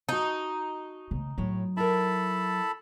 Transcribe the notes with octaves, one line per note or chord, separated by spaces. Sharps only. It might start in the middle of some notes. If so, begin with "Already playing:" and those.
D#4 F#4 A5
C#3 A3
A2 F#3 C#5
E4 A4 A#4 A5 B5